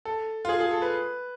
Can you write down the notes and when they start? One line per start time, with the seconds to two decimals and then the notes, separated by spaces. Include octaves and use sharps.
0.05 A4
0.45 F4
0.49 G#4
0.60 G#4
0.71 A4
0.82 B4